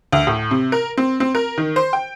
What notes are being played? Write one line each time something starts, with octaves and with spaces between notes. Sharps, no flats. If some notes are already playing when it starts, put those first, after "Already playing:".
D2
A2
C3
A#4
C4
C4
A#4
D#3
C5
G5